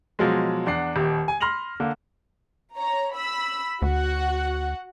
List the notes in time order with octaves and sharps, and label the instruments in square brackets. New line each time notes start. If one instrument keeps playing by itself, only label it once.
[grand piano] B2 F3 F#3 G#3
E2 D4 F#5 C7
D#1 D#2 G4
G#5
B5 C6 F6 A#6 F7 F#7
D3 A#3
[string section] C#5 A#5
B5 E6
[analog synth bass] D2 [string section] F#4 F#5